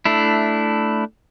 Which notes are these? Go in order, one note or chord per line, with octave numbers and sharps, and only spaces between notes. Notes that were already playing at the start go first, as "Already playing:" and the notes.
A3 D4 E4